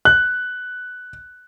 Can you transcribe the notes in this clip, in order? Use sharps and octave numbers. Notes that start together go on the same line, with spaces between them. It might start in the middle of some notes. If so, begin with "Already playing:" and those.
F#6